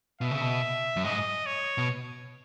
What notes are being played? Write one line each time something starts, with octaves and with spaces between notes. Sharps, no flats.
B2 E5
C#3
B2
F#2
G#2 D#5
C#5
B2